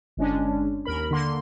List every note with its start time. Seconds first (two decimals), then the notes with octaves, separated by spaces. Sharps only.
0.17 G1 G#3 C#4 D4
0.85 D#2 A#4 B5
1.11 D3 A#3 C6